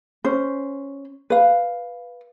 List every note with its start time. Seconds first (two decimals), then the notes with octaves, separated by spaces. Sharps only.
0.24 C#4 C5
1.30 B4 F5